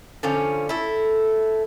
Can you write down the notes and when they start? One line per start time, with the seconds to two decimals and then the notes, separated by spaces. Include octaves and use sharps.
0.23 D3 F3 C#4
0.69 E4 A4